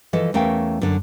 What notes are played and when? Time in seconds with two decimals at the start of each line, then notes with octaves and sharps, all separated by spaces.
0.13 E3 F3 A4 D#5
0.34 E2 A3 C#4 A#4 F5 G5
0.82 F#2 D3